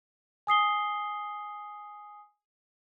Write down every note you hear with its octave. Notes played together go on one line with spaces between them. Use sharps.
G#5 D#6 C7 G7